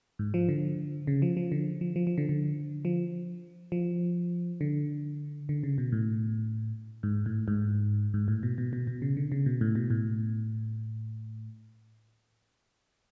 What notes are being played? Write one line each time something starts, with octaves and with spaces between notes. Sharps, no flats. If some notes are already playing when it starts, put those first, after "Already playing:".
G#2
F3
D3
C#3
F3
F3
D3
F3
F3
F3
D3
D3
F3
F3
D3
D3
C#3
B2
A2
G#2
A2
G#2
G#2
A2
B2
B2
B2
B2
C#3
D3
C#3
B2
A2
B2
A2